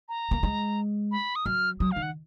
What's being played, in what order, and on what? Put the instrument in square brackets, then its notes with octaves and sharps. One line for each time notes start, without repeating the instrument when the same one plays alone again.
[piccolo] A#5
[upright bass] A#3
G#3
[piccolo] B5
D#6
[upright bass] F#3 [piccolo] F6
[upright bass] F#3 [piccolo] D#6
[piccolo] F5
[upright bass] D#3
[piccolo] F#5